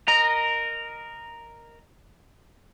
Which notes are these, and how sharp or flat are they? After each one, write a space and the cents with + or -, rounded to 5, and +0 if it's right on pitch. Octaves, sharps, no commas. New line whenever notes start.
A#4 +0 D#5 -20 A#5 +0